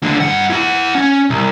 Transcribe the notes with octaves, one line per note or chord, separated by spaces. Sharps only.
C#2 D3
G2 F#5
E4 F#5
C#4
C2